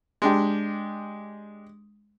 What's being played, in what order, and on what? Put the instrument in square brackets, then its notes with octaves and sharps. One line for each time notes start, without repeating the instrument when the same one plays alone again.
[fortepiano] G#3 D4 G4